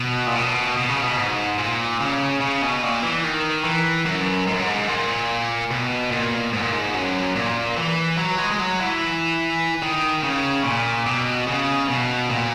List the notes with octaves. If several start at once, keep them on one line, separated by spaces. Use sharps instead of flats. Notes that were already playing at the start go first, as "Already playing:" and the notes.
Already playing: B2
A#2
B2
B2
C#3
B2
G#2
A#2
C#3
C#3
B2
A#2
E3
D#3
E3
F#2
G#2
F#2
G#2
A#2
B2
A#2
G#2
A#2
G#2
F#2
A#2
E3
F#3
G#3
G#3
F#3
E3
D#3
C#3
A#2
B2
C#3
B2
A#2